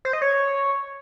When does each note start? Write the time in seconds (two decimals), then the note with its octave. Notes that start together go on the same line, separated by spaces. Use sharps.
0.05 C5
0.13 D#5
0.22 C#5